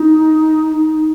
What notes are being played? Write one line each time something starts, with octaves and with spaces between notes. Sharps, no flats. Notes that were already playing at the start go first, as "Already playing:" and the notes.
Already playing: D#4